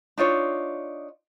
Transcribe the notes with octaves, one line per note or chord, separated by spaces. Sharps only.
D4 D#4 F4 C#5